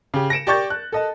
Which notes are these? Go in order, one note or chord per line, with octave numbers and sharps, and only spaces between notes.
C#3 G4
A#6 C#7 D7 E7
G4 D5 C#6 G6 A6
F#6
A4 D#5 A5